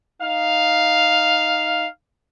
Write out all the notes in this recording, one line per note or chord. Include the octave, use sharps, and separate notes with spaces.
D#4 F5